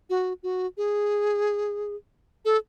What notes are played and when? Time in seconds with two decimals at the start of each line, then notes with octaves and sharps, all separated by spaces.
0.10 F#4
0.43 F#4
0.77 G#4
2.45 A4